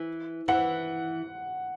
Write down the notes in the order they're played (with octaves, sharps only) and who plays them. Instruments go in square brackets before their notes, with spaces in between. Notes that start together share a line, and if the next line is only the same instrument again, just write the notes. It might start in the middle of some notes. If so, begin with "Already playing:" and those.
Already playing: [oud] E3
[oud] E3 [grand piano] F#5